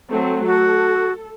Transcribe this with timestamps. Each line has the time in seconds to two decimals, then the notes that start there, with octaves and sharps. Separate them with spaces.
0.11 F#3 A3 C4
0.46 F#4 A4